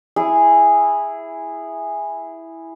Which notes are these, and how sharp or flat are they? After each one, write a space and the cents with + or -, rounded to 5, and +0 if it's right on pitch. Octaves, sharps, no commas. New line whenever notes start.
E4 +0 G#4 -10